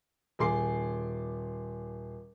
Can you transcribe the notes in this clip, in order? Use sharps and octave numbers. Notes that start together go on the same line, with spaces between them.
D#1 G#4 G#5 C6 D6 C7